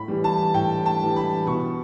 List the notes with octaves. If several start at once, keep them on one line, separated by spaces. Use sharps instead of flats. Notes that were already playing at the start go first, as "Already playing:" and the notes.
Already playing: A2 B5
E3 G3
A5
A2 G5
A5
E3 G3
B5
B2 C#6